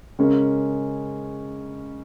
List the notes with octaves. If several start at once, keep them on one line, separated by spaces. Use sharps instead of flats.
C#3 G#3 C#4 A#4